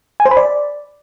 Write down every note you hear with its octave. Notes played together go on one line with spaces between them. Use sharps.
G#5
C5
B5
D5